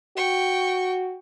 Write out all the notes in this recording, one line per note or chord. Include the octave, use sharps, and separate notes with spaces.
F#4 G5 C#6